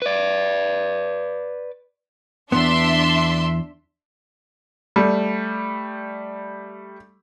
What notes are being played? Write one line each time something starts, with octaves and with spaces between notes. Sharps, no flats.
B4 D5
E2 G2 B3 D4 E5 C6
G3 A3